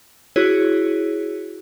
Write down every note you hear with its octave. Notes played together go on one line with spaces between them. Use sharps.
E4 F#4 G#4 C#5